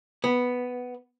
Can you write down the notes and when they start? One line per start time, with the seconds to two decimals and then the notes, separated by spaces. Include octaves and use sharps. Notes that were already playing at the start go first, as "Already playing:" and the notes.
0.24 B3